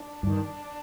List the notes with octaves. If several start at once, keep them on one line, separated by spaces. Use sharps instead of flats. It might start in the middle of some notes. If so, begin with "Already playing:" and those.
Already playing: D4
G2 D#3